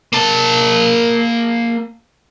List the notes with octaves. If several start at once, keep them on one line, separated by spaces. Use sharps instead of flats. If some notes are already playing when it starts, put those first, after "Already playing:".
A#3 A5